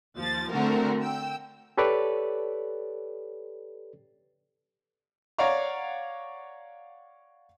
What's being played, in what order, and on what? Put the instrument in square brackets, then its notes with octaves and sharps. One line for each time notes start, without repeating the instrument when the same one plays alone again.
[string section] D#2 F3 A6
D3 A3 C4 F#4 A#4
G5 E6
[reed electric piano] G4 A4 B4 C#5 D5
[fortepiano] C#5 D5 F5 F#5 A#5 C#6